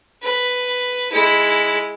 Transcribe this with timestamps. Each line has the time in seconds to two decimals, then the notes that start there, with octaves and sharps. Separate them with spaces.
0.23 B4
1.12 G#3 E4